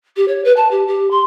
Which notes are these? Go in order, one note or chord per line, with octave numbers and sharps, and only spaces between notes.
G4
C#5
B4
A5
G4
G4
C6